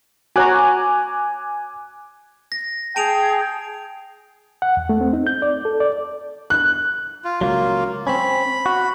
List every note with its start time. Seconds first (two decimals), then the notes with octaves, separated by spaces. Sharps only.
0.36 F#4 C#5 G#5 A#5 D6 F#6
2.52 A#6
2.96 G#4 G5 A5 D7 F7
4.62 F#5
4.77 E2
4.89 A3
5.01 C4
5.13 D#4
5.27 G6
5.42 D5
5.65 A4
5.80 D5
6.50 F#6
7.24 F4
7.41 C#2 G2 F#3 A#3 F4
8.07 C4 C#4 B5
8.66 F#4